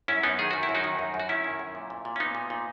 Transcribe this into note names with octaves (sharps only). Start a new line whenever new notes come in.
F#2 C#4 E4
F#2 B3 D#4
D#3 G#4
D#3 F#4
E4
F#2
D#4 F#4
D#3
F#2
F#2
F#4
D#3 C#4 E4
D#3
F#2
A#2
A#2
A#2
C#4
A#2 B3 D#4
A#2
A#2